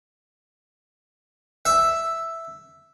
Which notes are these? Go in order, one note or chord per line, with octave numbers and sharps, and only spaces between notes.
E5